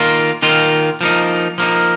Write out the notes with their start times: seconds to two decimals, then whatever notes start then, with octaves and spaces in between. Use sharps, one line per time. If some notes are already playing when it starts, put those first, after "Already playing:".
Already playing: D#3 A#3 F4
0.42 D#3 A#3 F4
1.01 F3 A#3 D#4
1.58 F3 A#3 D#4